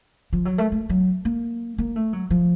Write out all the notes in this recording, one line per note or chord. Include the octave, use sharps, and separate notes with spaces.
F3
F#3
A3
A3
F#3
A#3
A#3
A3
F#3
F3